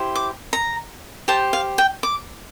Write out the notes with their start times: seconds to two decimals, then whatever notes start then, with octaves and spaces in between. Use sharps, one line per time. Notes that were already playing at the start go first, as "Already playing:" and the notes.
Already playing: E4 G4 C5
0.16 D6
0.53 A#5
1.28 G4 C5 A5
1.53 F5
1.78 G5
2.03 D6